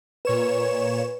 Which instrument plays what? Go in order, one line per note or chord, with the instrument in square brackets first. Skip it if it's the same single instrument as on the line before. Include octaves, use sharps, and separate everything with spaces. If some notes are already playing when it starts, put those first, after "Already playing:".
[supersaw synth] A#2 C#5 E7 [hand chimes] B4